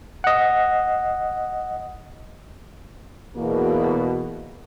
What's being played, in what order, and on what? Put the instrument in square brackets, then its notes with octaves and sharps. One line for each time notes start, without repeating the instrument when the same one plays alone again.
[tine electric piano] D#5 F#5
[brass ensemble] E2 B2 A#3